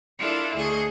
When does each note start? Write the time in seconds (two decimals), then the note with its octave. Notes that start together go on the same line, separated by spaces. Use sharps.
0.18 D4 E4 F4 A4 A#4 F5
0.54 D2 G#4 A4 D#5 C#6